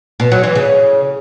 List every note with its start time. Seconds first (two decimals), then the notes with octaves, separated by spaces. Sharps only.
0.20 B2
0.32 F#3
0.44 E3
0.55 C#3